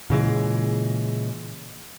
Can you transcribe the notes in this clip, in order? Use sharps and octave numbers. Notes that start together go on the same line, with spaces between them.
A#2 C#3 E3 G#3